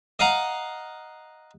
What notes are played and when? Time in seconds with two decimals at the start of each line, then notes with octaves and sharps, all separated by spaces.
0.19 D#5 F5 F#5 A#5